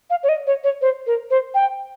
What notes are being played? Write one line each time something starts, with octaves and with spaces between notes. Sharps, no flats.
F5
C#5
D#5
C#5
C#5
C5
A#4
C5
G5